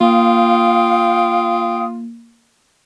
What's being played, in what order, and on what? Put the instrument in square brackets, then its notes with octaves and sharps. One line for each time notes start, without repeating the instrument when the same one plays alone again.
[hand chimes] A#3 [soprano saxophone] F4 [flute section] F5 G5 D#6